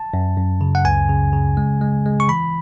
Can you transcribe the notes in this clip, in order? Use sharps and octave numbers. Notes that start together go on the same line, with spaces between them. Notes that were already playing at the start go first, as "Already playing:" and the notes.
Already playing: A5
F#2
F#2
C#3
F#5
C#2 G#5
C#3
C#3
G#3
G#3
G#3
C#6
E3 B5